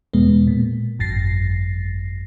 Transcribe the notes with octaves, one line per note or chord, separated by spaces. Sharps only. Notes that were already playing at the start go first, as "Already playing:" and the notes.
E2 B2 G#3 B3
A#2
G#1 F#2 A6 A#6 C7